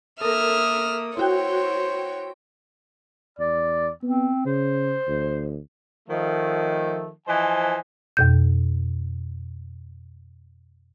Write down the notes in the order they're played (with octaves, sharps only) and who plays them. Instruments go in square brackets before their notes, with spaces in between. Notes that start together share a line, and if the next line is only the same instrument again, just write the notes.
[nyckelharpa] A#3 D#6 [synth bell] A4 A#4 [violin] E5 F6
[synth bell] E4 F#4 G5 [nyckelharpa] C5 [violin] C#5
[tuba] E2 [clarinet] D5
[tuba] B3 [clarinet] C4
[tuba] C#3 [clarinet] C5
[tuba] D2
[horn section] D#3 F3 A3
E3 F3 C5 D#5 G#5 A5
[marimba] F2 B2 G6